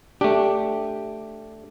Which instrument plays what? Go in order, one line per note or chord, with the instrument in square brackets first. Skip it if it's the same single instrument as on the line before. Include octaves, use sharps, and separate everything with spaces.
[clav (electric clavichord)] A3 D4 [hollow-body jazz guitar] G4